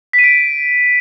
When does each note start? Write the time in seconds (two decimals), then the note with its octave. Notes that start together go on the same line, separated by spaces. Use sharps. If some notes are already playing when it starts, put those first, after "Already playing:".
0.13 B6
0.19 D#7
0.24 D7